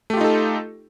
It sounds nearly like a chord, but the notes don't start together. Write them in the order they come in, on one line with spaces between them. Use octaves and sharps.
A3 G4 F4 D#4 A4